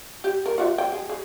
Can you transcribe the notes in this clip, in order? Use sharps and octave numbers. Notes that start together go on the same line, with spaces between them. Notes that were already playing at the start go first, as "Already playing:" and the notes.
G4
A#4
F4 F#4 E5
G5
G#4
G#4